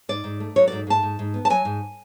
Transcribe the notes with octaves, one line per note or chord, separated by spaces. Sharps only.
G#2 D5
G#2
A3
F#3 C#5
G#2 D5
G#2 A5
G#2
G#2
B3
A5
F#3 G#5
G#2